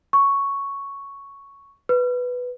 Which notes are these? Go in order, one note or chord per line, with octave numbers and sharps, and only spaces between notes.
C#6
B4